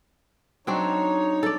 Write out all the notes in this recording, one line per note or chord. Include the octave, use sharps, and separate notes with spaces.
F#3 C4 D4 D#4 C#5
A4 D5